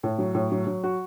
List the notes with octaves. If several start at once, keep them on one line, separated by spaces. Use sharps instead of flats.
A2
F#3
A2
F#3
F#3
F#4